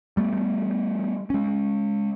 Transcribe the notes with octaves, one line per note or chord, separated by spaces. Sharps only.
G3 A3 B3
G#3 C#4